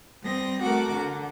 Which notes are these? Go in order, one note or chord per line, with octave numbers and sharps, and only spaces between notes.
G3 C4 D#6 A#6
A3 F#4 A#4 F#5 D6
D3